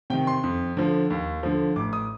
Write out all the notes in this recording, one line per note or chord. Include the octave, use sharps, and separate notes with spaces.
C3 D#3 G5
C6
F2
D3 F3
D#2
D3 F3
A1 D6
D#6